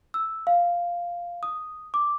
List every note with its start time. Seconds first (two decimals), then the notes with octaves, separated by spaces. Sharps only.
0.14 E6
0.47 F5
1.43 D#6
1.94 D6